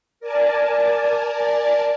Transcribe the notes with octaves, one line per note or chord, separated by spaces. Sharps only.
A#4 D5 G#5 A5